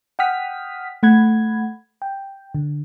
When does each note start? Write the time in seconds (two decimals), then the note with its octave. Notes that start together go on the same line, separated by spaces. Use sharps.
0.19 F#5 G5 D#6 F6 B6
1.03 A3 F#5 B5 G#6
2.02 G5
2.55 D3